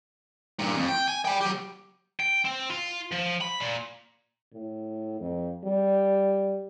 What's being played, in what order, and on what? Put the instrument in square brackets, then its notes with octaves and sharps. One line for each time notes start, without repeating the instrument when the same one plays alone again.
[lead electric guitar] G2 A#2
F2
G5
G#5
G5 B5
F#3 G4
[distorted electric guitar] G5
C4
F4
F3
B5
A#2
[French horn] A2
F2
G3